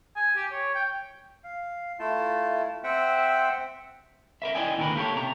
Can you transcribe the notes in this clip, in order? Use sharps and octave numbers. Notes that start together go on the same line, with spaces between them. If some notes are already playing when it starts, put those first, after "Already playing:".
G#5
G4
C#5
G5
F5
A3 E4 F4 A5
C4 C5 E5 F#5 G5
A#4 B4 E5
D#4 E4 D5 D#5 G5 G#5
D#2 D3 D#3 B3 A#4 B4
A#3 G4 A4 C#5
C3 A#5